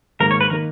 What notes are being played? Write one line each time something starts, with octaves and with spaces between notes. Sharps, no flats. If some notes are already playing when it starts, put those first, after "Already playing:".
G#2 D#3 A#3 A#4
C#5
B4
D#3 A#3 A#4